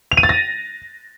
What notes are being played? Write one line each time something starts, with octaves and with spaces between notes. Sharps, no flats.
F7
D#7
A6
A#6